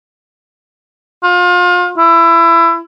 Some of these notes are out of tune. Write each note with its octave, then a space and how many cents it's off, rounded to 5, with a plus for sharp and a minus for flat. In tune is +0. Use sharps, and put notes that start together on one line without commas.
F4 +30
E4 +25